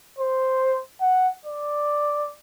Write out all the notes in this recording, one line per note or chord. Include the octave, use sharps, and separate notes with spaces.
C5
F#5
D5